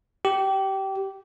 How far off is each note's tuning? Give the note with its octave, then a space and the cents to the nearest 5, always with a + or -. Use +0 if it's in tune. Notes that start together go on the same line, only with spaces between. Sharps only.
G4 -20